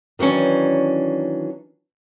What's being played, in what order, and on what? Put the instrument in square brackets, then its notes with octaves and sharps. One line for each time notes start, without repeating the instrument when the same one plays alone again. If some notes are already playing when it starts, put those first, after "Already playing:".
[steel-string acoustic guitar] D#3 E3 F#3 C#4 D4